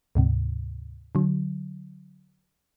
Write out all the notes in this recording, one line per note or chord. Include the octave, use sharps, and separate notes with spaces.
D2 G#2 C3
D3 F#3